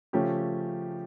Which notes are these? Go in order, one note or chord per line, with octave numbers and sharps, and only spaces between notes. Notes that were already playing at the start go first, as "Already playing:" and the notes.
C#3 F3 A3 C#4 G4